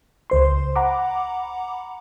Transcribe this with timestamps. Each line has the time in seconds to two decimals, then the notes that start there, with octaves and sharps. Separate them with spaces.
0.30 C#2 C5 C6
0.76 F#5 A#5 B5 D6